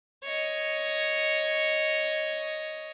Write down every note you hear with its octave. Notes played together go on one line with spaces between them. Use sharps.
C#5 D#5